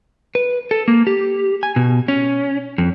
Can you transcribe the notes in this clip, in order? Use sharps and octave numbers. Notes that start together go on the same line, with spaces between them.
B4
A4
A#3
G4
G#5
B2
C#4
F2